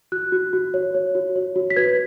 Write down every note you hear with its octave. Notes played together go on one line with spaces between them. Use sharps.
F#4 F#6
F#4
F#4
C#5
C#5
F#4
C#5
F#4
B6
B4 G#6